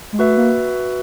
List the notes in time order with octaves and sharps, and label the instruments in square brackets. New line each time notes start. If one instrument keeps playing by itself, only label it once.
[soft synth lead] G#3
[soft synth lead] A3 [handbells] F#4 B4 E5
[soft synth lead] A#3